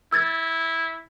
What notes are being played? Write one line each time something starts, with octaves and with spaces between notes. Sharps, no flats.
E4 E6 G#6 A6